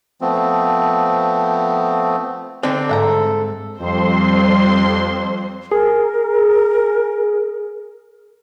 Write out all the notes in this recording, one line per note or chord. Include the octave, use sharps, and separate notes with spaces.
F3 A3 B3 C4
D3 C4 D4 D#4
G#2 A4 E5 F#5 A#5
F2 G3 C4 C5 C6
G#4 A#4